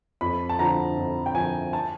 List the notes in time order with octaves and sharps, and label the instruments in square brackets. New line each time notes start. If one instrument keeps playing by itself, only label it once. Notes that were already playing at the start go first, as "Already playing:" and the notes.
[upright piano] F2 B5
A5
D3 F3 A#5
F2
G5
D3 F3 G#5
A5